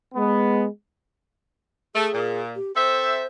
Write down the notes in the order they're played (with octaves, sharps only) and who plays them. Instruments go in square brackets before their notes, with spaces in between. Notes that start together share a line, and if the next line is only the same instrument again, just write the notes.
[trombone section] G#3 B3
[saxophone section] A3 [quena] G#4
[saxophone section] A#2
[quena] G4
[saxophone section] C4 A4 E5 [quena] C5